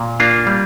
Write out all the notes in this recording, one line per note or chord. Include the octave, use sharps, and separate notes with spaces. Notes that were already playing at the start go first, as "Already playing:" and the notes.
Already playing: A#2
A#3 D4 F4
G3